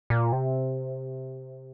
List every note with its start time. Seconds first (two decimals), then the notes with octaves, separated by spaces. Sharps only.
0.10 A#2
0.32 C3